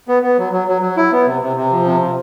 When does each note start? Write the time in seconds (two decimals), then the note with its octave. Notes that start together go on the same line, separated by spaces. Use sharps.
0.08 B3
0.23 B3
0.38 F#3
0.53 F#3
0.68 F#3
0.82 F#3
0.97 E4
1.12 B3
1.27 C3
1.42 C3
1.56 C3
1.72 F3
1.85 C3
2.01 C3